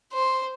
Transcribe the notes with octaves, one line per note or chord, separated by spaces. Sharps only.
C5